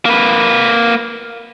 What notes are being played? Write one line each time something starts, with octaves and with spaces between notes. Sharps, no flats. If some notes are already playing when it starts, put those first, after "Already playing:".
A#3 B4